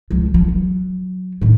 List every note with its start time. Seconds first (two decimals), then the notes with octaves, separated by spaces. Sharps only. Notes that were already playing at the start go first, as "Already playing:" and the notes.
0.11 C#2 F3
0.34 F3
0.48 F#3
1.41 A2 D#3